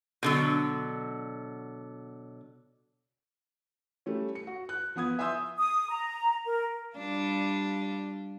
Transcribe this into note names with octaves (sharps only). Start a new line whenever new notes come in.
B2 D3 F#3
G3 A3 C#4
C#7
F#4
F#6
F3 B3 D#6 G#6
E5 G#5 C6 D#6 E6 G6
D#6
A#5
A#4
G3 D4 F4